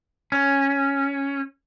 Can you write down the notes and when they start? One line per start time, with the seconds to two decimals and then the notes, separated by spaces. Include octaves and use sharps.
0.32 C#4